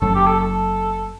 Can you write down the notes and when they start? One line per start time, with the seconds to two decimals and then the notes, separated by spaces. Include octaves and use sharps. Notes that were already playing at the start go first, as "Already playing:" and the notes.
0.01 F#1 F#2 F#3 A4
0.15 G4
0.27 A4
0.40 A4